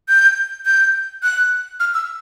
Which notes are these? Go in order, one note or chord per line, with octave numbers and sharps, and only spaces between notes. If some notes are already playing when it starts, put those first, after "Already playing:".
G6
G6
F#6
F6
E6